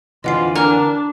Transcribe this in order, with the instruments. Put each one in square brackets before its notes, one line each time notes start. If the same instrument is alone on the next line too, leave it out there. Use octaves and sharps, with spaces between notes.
[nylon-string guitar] F2 D3 E3 [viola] F4 [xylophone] D#5 F#5 C7
[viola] D4 [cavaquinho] A#4 [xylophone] G#5 F6